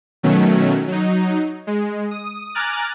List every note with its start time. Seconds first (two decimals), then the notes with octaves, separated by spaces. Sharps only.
0.23 B2 D#3 F#3 A3 C#4
0.87 F#3 D#4
1.67 G#3
2.11 D#6
2.55 G#5 A#5 D6 F6 F#6 A6